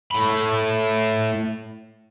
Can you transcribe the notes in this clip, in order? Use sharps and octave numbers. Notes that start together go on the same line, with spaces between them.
A2 B5